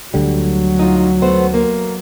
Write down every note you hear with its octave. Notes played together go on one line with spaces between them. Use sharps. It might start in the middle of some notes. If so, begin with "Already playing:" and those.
D2 D3 F#3 G3
D#4 F4
A3 B3 C5
A#3